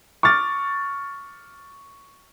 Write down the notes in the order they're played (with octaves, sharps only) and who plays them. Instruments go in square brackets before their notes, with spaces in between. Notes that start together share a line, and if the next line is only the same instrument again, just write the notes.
[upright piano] C#6 D6 F6 A6